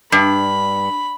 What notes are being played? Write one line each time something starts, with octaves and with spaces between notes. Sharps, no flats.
G2 B5